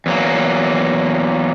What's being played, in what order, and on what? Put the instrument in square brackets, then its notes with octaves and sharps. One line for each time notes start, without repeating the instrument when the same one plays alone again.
[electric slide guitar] E2 F#3 A#3